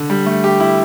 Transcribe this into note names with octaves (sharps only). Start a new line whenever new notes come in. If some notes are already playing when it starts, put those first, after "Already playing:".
Already playing: D3
G3
A3
G4
E4